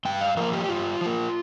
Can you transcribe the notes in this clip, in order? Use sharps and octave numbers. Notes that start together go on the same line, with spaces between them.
G2 G5
F5
F3 A#3 A#4
G4
G2 F4
F3 A#3